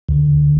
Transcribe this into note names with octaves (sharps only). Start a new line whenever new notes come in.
D2